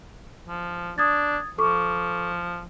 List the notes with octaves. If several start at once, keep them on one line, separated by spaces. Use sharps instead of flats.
F3
D4 D#6 G#6 A6
F3 A4 C#6 D6